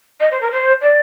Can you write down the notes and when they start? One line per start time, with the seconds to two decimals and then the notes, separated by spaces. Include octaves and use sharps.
0.20 D#5
0.31 C5
0.41 A#4
0.51 C5
0.81 D5